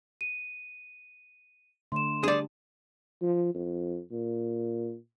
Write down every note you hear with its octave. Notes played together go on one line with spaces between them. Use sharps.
D#7
D3 A3 C6 E7
G3 D4 G#4 D5
F3
F2
A#2